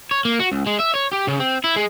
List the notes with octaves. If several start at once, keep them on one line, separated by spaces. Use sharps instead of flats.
C#5
A#3
F#4
C#2
G#3
E5
C#5
G4
C#3
C4
E4
G#3